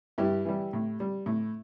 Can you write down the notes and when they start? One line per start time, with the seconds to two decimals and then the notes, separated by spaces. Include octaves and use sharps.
0.18 G2 E4 G4
0.45 E3 G3
0.73 A2
1.00 G3
1.26 A2